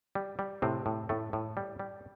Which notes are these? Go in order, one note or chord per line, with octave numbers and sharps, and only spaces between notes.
G3
G3
A2 C3 C4
A2
A2 A3
A2
G3
G3